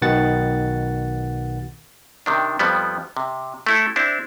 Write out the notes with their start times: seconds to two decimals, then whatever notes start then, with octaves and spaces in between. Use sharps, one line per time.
0.02 B1 B2 D#3 F#5 A6
2.26 C3 D#3 D4
2.59 F2 F3 G3 B3
3.17 C3
3.67 A3 E4 A4
3.96 C4 D4 E4